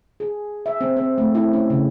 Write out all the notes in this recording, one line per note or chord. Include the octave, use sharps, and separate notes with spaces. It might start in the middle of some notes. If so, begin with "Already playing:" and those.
G#4
E5
C4
C4
A3
E4
C#4
C#3